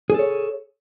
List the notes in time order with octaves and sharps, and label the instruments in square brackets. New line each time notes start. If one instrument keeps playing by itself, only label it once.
[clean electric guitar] G#4
A4
C#5